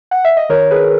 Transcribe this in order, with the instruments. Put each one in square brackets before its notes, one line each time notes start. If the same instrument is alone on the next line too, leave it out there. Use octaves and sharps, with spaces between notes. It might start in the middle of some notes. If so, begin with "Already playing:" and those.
[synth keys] F#5
E5
D#5
D#3 A#4 C#5
G#4 B4